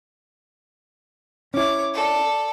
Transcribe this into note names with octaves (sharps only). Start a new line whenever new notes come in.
C#4 E4 C#5 D6
A4 D5